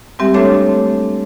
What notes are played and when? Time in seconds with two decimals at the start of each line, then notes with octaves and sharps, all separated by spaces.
0.19 G3 G#3 C4 G4 E5
0.34 A3 D4 A4 C#5 D6